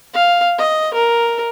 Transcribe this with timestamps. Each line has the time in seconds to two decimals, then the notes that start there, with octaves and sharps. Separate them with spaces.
0.14 F5
0.58 D#5
0.94 A#4